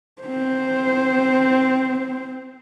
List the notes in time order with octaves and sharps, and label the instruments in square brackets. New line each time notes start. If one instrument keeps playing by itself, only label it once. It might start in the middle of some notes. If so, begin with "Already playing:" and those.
[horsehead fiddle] C4 C5